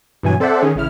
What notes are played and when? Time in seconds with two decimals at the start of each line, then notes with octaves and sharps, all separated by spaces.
0.23 G2 B2 E3 F#3 G#5
0.40 C4 A4 C5 D5 E5 F#5
0.62 D#3 C#4 G#4
0.75 A1 C#3 E4 F6